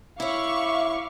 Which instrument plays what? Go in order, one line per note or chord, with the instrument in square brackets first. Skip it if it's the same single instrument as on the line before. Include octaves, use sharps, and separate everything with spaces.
[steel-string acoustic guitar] E4 C#5 [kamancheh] E5 B5 [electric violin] F5 D6 [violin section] C#6